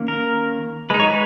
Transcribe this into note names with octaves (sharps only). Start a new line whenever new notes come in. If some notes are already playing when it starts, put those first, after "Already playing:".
Already playing: D#3 A#3 C#4
A#4
G#3 D#4 B4
C#5
B4